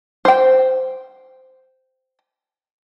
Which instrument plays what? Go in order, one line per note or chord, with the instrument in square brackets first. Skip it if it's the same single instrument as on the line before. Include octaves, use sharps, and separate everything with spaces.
[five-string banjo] C5 G5